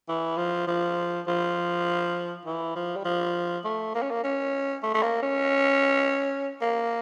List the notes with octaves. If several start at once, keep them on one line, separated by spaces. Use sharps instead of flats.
E3
F3
F3
F3
E3
F3
G3
F3
A3
A#3
C#4
A#3
C#4
A3
A3
A#3
C#4
A#3